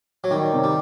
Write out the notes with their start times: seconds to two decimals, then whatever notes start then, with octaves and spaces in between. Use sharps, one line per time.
0.24 F#3
0.31 D#3 G3
0.53 C3
0.64 G3